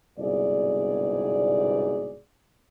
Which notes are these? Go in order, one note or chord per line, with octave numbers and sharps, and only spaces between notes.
G1 C2 G#2 B2 G#4 D5